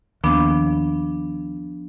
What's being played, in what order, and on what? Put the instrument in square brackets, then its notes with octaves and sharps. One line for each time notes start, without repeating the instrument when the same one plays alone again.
[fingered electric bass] D#2 [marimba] F3 B3 D4